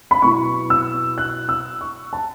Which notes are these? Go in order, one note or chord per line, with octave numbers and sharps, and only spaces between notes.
B5
B2 F#3 B3 E4 C#6
E6
F#6
E6
C#6
A5